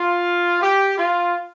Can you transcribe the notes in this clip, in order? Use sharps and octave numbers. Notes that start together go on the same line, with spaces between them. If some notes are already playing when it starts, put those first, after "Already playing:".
Already playing: F4
G4
F4